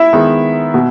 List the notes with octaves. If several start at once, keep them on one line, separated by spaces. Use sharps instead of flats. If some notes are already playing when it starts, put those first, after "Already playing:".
Already playing: E4 E5
D#3 G#3 B3
B2